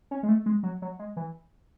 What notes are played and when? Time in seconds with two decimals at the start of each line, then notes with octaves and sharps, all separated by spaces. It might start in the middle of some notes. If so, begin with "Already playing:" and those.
0.11 C#4
0.23 G#3
0.28 A3
0.46 G#3
0.63 F#3
0.82 F#3
0.99 G#3
1.17 E3